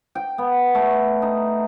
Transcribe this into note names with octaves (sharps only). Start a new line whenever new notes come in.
G5
B3
A3
D#4